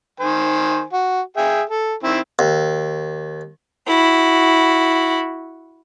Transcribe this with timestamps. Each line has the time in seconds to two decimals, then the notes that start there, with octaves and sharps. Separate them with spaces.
0.20 D#3 C5 G#5
0.93 F#4
1.37 G#4 E5 G5
1.69 A4
2.03 D#3 C4 E4
2.39 D#2
3.87 E4 F#4